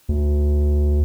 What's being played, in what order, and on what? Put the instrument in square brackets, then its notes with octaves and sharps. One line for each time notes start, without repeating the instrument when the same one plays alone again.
[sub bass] D2